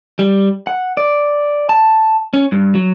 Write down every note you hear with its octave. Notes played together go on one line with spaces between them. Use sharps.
G3
F#5
D5
A5
C#4
G2
F#3